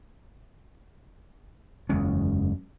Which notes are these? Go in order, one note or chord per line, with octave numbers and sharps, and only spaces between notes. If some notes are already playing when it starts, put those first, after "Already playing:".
F#1 E2 G#3 C#4